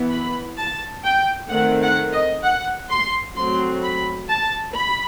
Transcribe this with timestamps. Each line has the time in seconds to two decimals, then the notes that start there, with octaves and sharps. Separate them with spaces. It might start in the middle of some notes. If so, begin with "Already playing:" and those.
Already playing: E3 B3
0.12 B5
0.57 A5
1.04 G5
1.50 D#3 A3 C4 F#5
1.82 F#5
2.13 D#5
2.43 F#5
2.90 C6
3.36 F#3 A3 C4 C6
3.83 B5
4.29 A5
4.75 B5